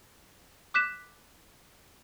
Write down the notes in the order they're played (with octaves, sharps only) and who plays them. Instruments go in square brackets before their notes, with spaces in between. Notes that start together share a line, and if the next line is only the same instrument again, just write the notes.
[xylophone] D6 F#6 B6 E7